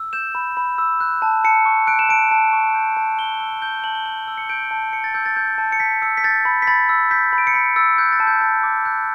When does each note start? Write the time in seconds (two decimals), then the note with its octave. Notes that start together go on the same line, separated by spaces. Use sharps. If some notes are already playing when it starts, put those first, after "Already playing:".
Already playing: E6
0.13 G6 E7
0.35 B5
0.57 B5
0.78 E6
1.00 F#6
1.22 A5
1.44 A5 C#7
1.66 C#6
1.87 F#6 D7
1.99 E7
2.09 A5 D7
2.31 A5
2.53 C#6
2.75 G6
2.97 A5
3.18 A5 G7
3.40 E6
3.62 G6 G7
3.84 A5 F#7
3.95 G7
4.06 A5 F#7
4.28 E6
4.38 C#7
4.49 G6 D7
4.71 A5
4.93 A5 C#7
5.04 A6
5.14 E6 G6
5.26 A6
5.36 G6
5.58 A5
5.72 C#7
5.80 A5 B6
6.02 E6 C#7
6.17 B6
6.24 G6 A6
6.45 B5
6.62 B6
6.67 B5 A6
6.89 E6
7.11 G6 B6
7.33 B5
7.38 D7
7.47 C#7
7.54 B5 B6
7.76 E6 A6
7.98 F#6 G6
8.12 A6
8.20 A5
8.27 G6
8.42 A5 A6
8.63 D6
8.85 F#6 G6